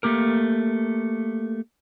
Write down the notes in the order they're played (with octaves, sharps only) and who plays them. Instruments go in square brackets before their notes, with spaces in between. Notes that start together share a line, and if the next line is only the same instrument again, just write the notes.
[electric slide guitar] A3 A#3 G4 A#4